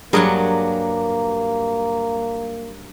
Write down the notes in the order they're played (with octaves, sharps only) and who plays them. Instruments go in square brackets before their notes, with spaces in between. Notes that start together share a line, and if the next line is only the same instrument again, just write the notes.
[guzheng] G2 F#3 F#5 [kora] G3 G#4 A#4 [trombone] A#3